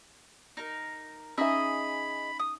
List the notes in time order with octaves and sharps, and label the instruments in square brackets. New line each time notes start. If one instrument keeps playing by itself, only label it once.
[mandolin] D#4 A#4
[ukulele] C#4 D#4 E5 [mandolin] G#4 D#5 E6 [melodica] B5
[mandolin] D#6